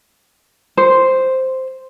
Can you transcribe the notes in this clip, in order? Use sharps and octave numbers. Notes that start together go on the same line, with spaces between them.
C5